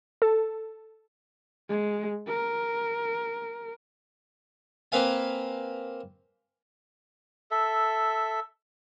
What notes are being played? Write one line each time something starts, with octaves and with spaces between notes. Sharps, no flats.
A4
G#3
A#4
A#3 C4 B4 F5 G#5
A4 E5